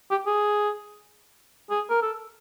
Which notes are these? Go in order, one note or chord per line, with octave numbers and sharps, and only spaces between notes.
G4
G#4
G#4
A#4
A4